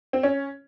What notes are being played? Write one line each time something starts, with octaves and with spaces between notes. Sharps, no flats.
C4
C#4